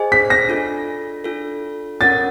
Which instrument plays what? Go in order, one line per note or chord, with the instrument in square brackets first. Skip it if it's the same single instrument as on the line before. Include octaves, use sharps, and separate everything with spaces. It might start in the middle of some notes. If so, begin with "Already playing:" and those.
Already playing: [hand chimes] G#4 C5 D#5 G#5
[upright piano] B6
A#6
[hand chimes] D4 F4 A4
D4 F4 A4
[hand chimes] C#4 F4 A#4 C#5 F#5 [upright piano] A6